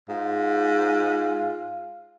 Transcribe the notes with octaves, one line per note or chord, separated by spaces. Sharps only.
G#2 F4